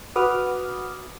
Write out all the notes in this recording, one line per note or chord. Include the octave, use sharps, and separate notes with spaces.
F#4 B4 F#5 D6 D#6 F6